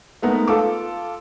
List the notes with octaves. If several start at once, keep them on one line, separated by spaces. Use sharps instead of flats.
G#3 A3 B3 D#4 A#4 B4
F4 A4 D6